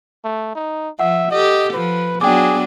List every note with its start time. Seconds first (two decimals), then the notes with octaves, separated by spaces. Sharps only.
0.25 A3
0.55 D#4
0.99 F3 E5 F#5
1.31 G4 A4 D#5
1.74 F3 B4
2.21 F#3 B3 D4 G#4 G5 D6